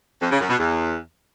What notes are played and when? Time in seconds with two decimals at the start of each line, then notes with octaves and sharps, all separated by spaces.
0.22 F2
0.31 C#3
0.40 F#2
0.50 B2
0.59 E2